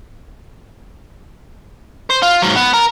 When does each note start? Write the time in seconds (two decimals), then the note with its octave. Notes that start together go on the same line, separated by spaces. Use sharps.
2.10 C5
2.23 F4
2.42 G#2 F#3
2.56 B3
2.73 A#4